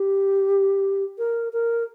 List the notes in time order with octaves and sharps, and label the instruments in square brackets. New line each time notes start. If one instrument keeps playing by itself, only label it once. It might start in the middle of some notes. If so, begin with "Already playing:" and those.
Already playing: [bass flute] G4
A#4
A#4